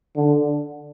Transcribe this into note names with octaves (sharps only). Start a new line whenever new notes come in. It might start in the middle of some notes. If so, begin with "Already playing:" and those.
D3